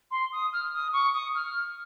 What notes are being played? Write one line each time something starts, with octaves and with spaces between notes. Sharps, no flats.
C6
D#6
F6
D#6
C#6
D#6
F6